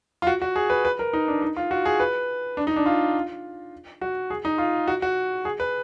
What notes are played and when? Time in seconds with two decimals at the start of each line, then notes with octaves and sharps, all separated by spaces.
0.22 F4
0.27 F#4
0.42 F#4
0.56 G#4
0.70 B4
0.85 B4
0.99 A#4
1.13 D#4
1.28 D4
1.42 D#4
1.57 F4
1.71 F#4
1.85 G#4
2.00 B4
2.57 D4
2.67 D#4
2.76 D4
2.86 F4
4.01 F#4
4.30 G#4
4.45 D#4
4.58 F4
4.88 F#4
5.02 F#4
5.45 G#4
5.60 B4